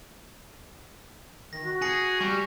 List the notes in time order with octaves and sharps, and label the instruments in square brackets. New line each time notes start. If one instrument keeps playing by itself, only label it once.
[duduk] D#3 [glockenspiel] A#6
[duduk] F#4
[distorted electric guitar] G#4 [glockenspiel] G#5 A#6 C#7
[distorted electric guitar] G3 [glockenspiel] C#6